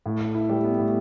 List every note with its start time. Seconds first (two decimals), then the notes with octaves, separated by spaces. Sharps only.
0.06 A2
0.20 A2
0.35 E4
0.49 G3
0.64 B3
0.79 A2